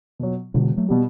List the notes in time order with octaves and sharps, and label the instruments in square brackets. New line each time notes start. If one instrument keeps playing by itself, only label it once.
[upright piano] B2 F#3
[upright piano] E1 [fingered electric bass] B2 D3
[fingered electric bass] F#3 A3
[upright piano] B2 G3 [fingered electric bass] B3